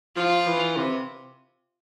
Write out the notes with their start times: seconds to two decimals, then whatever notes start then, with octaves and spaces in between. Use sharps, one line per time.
0.16 F3 F4
0.46 E3
0.77 C3